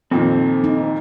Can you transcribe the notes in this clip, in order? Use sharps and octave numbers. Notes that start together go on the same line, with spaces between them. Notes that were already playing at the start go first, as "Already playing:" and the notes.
F2 A#2 D#3 C4 A4
D#4